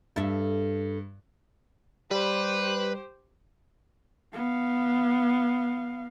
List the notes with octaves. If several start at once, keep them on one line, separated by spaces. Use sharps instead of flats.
G2 A4 E5
G3 G4 B4 C5
B3 F5